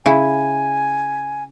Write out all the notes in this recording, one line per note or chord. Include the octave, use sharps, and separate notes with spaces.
C#3 E4 G#5